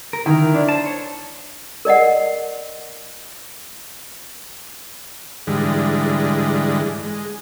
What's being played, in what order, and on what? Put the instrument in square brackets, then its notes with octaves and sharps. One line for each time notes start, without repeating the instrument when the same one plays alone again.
[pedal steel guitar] A#4
[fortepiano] D#3 [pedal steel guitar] E4 A#4
[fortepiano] D4
[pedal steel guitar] C5 A5
C#5
[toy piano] A#4 D5 D#5 F#5
[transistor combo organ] G#2 D3 E3 G3 G#3
G#3